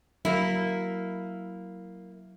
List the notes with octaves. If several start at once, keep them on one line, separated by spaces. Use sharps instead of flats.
F#3 A#3 E4